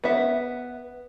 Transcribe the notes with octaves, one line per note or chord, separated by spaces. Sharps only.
B3 E5